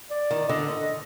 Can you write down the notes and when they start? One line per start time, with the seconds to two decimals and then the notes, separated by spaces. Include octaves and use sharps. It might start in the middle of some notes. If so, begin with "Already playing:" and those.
0.10 D5
0.31 D#3
0.49 D3 D#5